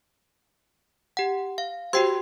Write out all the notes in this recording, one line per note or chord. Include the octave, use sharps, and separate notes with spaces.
G4 F#5
F5
F#4 G4 C5 G5 C6